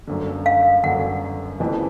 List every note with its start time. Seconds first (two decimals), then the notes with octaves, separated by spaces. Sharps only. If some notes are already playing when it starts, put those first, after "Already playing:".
0.07 G1 F#2 D3
0.46 F5
0.83 G1 F#2 D3 F#5
1.60 F#1 F2 C#3 E3